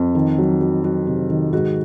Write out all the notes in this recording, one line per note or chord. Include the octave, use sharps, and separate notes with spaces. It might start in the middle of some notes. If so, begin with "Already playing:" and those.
Already playing: F2
D#3
F#3
F#3
F#3 F#4
C3
D#3
G#2 F#4